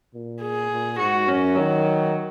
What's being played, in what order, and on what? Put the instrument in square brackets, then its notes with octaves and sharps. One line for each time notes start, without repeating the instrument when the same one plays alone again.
[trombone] A#2
[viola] G#4
[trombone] A#2
[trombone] G#2 [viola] F#4
[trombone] F#2 [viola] C#4
[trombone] D#3 [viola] F#3